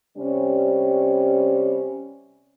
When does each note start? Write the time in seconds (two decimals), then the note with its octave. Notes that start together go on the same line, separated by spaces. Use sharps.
0.17 C3 G3 C#4